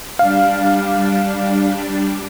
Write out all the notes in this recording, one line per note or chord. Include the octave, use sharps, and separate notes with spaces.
G3 D4 F5